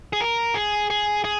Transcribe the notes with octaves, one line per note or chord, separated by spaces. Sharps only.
G#4
A#4
G#4
G#4
G#4